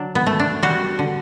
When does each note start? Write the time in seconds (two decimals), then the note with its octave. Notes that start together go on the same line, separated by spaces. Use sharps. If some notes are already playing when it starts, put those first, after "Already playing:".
Already playing: D3 F#3 D4
0.15 B3
0.26 A3
0.39 D4
0.63 G3 F#4
0.99 D3